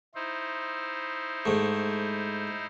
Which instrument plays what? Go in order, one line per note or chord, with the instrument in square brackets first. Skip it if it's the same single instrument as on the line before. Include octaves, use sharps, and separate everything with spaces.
[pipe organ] D#4 E4 C5
[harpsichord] G#2 A3